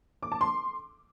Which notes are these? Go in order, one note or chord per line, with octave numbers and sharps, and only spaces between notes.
D6
A5
C6